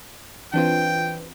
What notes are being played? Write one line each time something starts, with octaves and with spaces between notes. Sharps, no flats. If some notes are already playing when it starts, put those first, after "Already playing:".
E3 C4 D4 F4 B4 C5 G5